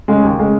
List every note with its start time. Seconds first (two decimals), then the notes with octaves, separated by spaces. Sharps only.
0.08 C#3 G#3
0.23 D#2
0.39 C#3 G#3